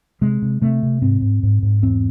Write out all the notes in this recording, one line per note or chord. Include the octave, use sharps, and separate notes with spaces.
C3 G#3
C3
C3 A3
C3
G#2 C4
G#2
G#2
G#2
E2 C4